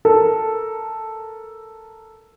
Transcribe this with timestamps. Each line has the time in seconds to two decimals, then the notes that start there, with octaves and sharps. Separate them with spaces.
0.05 A4 A#4